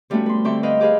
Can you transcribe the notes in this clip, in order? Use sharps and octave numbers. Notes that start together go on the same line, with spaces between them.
F3 G3 A3 B3 C#4 F#4
B4 C6
D3 C4 G4 E5 G5 C#6
B4 D#5 F5 G5
G4 G#4 B4 F5